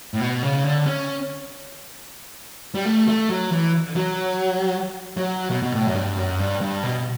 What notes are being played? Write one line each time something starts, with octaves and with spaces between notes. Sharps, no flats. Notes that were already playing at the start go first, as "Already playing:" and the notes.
A2
B2
C#3
D3
C#4
G3
A3
A3
F#3
E3
F#3
F#3
B2
B2
A2
F#2
G2
F#2
G2
G2
B2